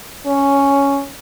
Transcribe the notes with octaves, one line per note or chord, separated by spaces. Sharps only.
C#4